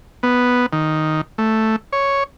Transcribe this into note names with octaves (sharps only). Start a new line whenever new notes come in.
B3
D#3
A3
C#5